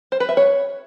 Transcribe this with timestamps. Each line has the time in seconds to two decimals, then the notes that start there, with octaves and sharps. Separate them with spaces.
0.12 C5
0.20 B4
0.29 E5
0.37 C#5